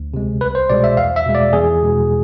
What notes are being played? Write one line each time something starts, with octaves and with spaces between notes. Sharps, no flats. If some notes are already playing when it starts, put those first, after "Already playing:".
Already playing: D2
C3 G#3
C2 B4
C5
B2 G#3 D5
E5
E2 F5
E5
B2 G#3
D5
E2 G#4
B2 G#3